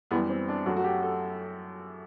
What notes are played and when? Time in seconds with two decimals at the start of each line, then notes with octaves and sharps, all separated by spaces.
0.11 F#2 E3 G3 B3
0.29 C4
0.48 D4
0.66 F#2 F#3 A3 F#4
0.76 F#4
0.84 G4
1.02 A4